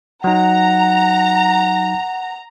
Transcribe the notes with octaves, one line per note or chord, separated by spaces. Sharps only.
F#3 D#4 F#5 A#5